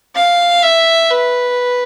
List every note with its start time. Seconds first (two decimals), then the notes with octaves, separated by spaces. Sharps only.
0.16 F5
0.62 E5
1.10 B4